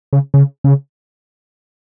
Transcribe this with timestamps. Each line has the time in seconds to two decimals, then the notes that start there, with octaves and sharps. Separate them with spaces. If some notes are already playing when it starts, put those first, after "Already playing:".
0.13 C#3
0.34 C#3
0.64 C#3